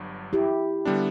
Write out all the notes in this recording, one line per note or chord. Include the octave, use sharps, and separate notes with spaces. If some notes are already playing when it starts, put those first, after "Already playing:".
Already playing: G1 G2 F#3
E4 G4
D3 G3 B3 D4